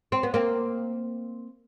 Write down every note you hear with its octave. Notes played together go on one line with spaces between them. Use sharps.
C4
B3
A#3 C4